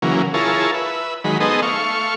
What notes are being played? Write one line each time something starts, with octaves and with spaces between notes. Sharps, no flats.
C#3 E3 F#3 A#3
E4 F4 G#4 A#4 C#5 A5
B4 E5
D#3 F#3 G#3 B5
B3 D#4 G#4 A4 C5 D#5
A3 F5 C#6